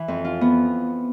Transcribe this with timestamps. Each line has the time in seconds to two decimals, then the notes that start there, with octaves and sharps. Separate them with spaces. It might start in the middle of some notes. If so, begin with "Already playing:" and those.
Already playing: E3
0.08 F2
0.25 F4
0.41 B3